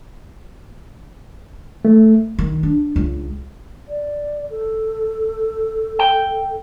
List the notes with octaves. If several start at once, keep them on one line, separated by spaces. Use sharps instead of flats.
A3
D#3
D4
C#2
D5
A4
G5